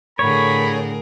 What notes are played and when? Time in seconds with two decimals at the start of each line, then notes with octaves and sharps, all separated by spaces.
0.19 A2 D3 G#4 A#4 C#5 B5